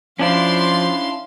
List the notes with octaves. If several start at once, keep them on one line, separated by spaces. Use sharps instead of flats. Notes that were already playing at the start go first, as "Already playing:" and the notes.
F3 C#4 D4 E4 F5 C6